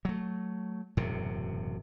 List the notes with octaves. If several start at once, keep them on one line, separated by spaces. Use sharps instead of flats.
F#3 A3
E1 F#2 A2 C3